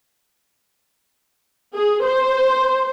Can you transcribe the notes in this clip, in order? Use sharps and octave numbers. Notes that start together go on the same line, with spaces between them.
G#4
C5